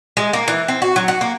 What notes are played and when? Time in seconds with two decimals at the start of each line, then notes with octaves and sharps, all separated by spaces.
0.17 G#3
0.33 A#3
0.48 E3
0.68 C4
0.82 F#4
0.96 F#3
1.08 F#4
1.21 A#3